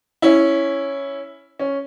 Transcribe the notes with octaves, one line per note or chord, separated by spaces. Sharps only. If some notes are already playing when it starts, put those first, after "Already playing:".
C#4 E4
C#4